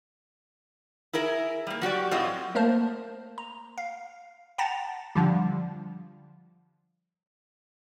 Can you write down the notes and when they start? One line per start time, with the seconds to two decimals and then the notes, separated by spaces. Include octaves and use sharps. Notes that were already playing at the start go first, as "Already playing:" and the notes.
1.13 E4 G#4 A#4 E5
1.67 G3 A#3
1.82 F#3 F#4 G4 D5
2.11 A2 F#3 C4 F4 C5 D#5
2.55 A3 A#3 A#4 C5 A5
3.38 A#5
3.78 F5
4.58 F#5 G5 A5 A#5 A6 A#6
5.15 D3 F3 G3